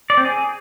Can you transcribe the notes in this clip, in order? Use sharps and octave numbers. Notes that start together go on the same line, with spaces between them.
D5
C4
G#4